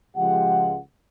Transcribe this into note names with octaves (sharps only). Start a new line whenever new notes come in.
C#2 F3 G#3 F4 G4 F#5